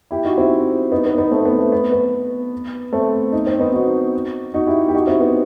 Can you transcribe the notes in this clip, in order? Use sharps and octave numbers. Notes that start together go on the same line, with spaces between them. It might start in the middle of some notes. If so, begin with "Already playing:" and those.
E4 G4
D#4 F#4
C4 E4
B3 D#4
B3
B3 D#4
A3 C4
B3
A3
B3
B3
A3 C4
D#4
C4
B3 D#4
D#4 F#4
D#4 F#4
E4 G4
G4
D#4 F#4
C4 E4
B3 D#4